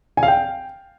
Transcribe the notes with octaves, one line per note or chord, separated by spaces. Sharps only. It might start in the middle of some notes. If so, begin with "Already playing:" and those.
G#5
F5
G5